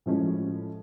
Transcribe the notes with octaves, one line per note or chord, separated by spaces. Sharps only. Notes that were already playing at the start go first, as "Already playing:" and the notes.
A2 F3 G#3 C#4